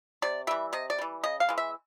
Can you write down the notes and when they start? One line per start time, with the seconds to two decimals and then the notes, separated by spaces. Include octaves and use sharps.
0.22 C3 D5
0.47 E3 G3 E5
0.73 C3 D#5
0.90 D5
0.98 E3 G3
1.23 C#3 D#5
1.40 F5
1.49 E3 G#3
1.58 E5